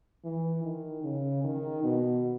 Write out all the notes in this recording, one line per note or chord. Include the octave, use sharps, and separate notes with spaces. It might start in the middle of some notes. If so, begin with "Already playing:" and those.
E3
D#3
C#3
D#3
B2